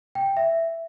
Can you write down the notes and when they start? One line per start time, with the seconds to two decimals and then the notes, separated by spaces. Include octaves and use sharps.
0.15 G5
0.26 G5
0.37 E5